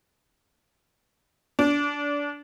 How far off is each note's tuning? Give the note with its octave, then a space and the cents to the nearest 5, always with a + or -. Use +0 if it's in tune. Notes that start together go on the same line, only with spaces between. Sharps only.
D4 -25